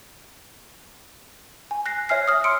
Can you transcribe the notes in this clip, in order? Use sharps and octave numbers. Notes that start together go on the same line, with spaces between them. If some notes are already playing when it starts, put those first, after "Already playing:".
G#5
F#6 A#6 C7
C#5 E5 G#5 F6 C7
D#6 F6
C6 E6 C#7 D7